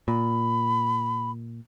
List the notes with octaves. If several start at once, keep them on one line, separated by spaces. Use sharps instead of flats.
A#2 B5